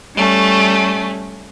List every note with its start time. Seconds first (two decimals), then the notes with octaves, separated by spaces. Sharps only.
0.15 G3 A3 C#4